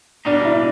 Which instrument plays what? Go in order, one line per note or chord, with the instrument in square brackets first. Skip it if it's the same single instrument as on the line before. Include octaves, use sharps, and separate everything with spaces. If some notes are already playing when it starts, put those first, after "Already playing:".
[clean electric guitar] B2 G3 A#3 D#4 [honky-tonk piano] D4
[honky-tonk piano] E4